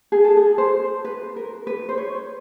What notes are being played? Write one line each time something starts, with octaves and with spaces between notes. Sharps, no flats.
G#4
A4
G#4
C5
B4
A#4
B4
C5
C#5